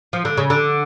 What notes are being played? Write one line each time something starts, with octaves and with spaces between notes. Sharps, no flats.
F3
D3
C#3
D3